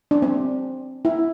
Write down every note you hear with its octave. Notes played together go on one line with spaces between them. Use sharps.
D4
C4
E4